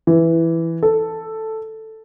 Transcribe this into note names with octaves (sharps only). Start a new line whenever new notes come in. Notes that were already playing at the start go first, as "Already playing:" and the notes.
E3
A4